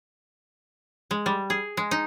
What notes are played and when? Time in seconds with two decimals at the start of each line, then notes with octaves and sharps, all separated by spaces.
1.11 G#3
1.26 G3
1.50 G#4
1.77 G#3
1.91 D#4